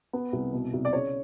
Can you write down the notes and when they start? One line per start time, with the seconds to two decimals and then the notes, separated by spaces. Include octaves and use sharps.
0.13 B3
0.33 C2
0.53 B2
0.73 C2
0.85 D5
0.93 C#3 C#5